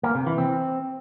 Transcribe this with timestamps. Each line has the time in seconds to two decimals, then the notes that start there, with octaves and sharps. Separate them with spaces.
0.03 A#3
0.15 C3
0.27 E3
0.38 C4